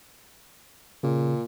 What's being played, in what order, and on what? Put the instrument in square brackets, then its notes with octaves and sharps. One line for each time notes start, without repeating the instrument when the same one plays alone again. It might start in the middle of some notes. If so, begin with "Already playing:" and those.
[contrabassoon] A#2 [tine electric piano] C#3